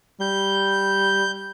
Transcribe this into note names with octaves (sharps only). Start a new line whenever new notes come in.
G3 G6